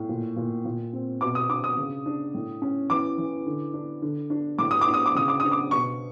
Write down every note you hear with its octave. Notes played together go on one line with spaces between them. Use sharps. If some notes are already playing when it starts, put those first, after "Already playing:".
Already playing: A2
A#2
A#2
A#2
C4
B2 D6
D#6
D4 D6
D#6
C#3
D4
A2
C#4
E3 D6
E3
D3
D4
D3
D4
A2 D6
D#6
D6
D4
D#6
D6
C#3 D#6
D6
D4 D#6
D6
B2 C#6